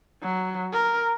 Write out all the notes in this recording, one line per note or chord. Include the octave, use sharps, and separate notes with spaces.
F#3
A#4